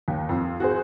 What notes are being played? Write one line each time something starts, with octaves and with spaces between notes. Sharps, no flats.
D#2
F2
F#4 G#4 C5